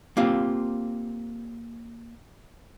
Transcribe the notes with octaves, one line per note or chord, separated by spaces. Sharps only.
A#3 C4 F4 G4